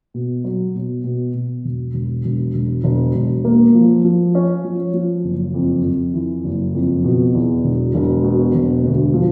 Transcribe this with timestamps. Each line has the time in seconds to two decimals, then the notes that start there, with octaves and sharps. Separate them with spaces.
0.14 B2
0.44 F#3
0.75 B2
1.04 B2
1.34 B2
1.64 E1
1.94 E1
2.25 E1
2.54 E1
2.84 E1
3.15 E1
3.44 A#3
3.75 F3
4.04 F3
4.35 C#4
4.64 F3
4.94 F3
5.24 F#1
5.54 F2
5.84 F2
6.14 E3
6.44 F#1
6.74 F2
7.04 B2
7.34 E2
7.64 E1
7.94 E1
8.24 B2
8.54 E1
8.84 D2
9.14 F3